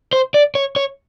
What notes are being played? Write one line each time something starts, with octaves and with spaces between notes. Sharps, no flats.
C5
D5
C#5
C#5